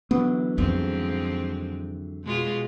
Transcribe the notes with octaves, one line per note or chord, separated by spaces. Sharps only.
D3 E3 F#3 B3
F2 G#2 F3 C4
B2 G#3 F4